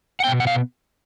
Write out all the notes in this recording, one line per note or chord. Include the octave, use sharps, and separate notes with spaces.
F#5
B2 G3 B3 G5
F#5
F5